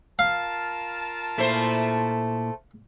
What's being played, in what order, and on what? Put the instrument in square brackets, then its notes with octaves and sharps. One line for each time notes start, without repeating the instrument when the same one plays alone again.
[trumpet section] F4 A#4 A5 [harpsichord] F5
[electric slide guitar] A#2 E4 [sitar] A3 C5